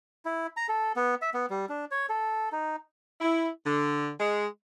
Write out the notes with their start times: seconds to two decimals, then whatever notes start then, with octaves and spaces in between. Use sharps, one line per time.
0.25 E4
0.57 A#5
0.69 A4
0.96 B3
1.22 E5
1.34 B3
1.50 G3
1.69 D4
1.91 C#5
2.09 A4
2.52 D#4
3.21 E4
3.65 D3
4.18 G#3